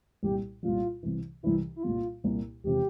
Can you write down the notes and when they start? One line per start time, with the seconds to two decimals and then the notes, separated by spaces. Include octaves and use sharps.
0.23 C2 A#2 G3 G4
0.63 C2 A#2 G3 F4
1.03 C2 C3 E3
1.43 C2 C3 E3 E4
1.76 E4
1.83 C2 A#2 G3 A#3 F4
2.24 C2 A#2 G3 A#3
2.64 E1 C3 F3 G4